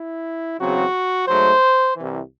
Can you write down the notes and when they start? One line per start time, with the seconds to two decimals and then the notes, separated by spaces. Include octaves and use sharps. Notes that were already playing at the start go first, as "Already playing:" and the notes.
Already playing: E4
0.60 E2 C#3 F#3 C4 F#4
1.27 G#2 F#3 A3 C5
1.96 C2 C3 E3